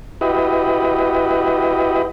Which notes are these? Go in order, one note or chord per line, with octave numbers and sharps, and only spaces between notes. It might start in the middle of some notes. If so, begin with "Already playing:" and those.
E4 F#4 G4 B4 D#5